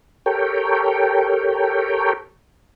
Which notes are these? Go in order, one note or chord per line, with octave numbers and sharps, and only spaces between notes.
G4 A4 A#4 C#5 G5